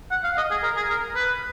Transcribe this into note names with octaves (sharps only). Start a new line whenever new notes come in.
F#5
F5
D#5
G#4
A#4
G#4
A#4
B4